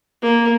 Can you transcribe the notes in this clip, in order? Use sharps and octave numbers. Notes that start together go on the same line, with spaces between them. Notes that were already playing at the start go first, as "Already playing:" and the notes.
A#3